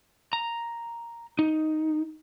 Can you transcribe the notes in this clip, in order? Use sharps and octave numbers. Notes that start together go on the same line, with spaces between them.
A#5
D#4